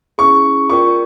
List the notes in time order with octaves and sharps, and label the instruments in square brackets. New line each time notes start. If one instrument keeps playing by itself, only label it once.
[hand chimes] C#4 E4 G#4 [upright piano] C#6
[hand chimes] F4 A#4 D5 G5 [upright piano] C#6